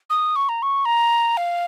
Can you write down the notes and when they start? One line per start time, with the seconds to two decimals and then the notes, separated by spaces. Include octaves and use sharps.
0.10 D#6
0.36 C#6
0.49 A#5
0.62 C#6
0.85 A#5
1.37 F5